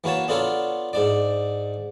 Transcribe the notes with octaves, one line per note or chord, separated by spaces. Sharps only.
E3 A#3 F#4 C#5 A5
B3 D4 F4 A4 A#4 C#5
G#2 D4 D5